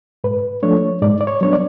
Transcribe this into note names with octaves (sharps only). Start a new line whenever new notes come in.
G#2 B4
F3 A3 D4 C#5
G#2 D5
D5
C#5
F#3 B3 D4 C#5
D5